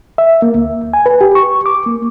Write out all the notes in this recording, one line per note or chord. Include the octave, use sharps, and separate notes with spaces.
E5
A#3
D2
G#5
B4
G4
C#6
D6
A#3